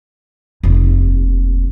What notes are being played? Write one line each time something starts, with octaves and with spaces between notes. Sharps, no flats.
F1 D#2